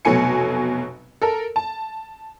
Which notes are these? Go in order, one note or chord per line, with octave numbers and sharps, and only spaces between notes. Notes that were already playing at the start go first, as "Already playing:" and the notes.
F1 B2 F#3 A3 G#5 C#7
A4 A#4
A5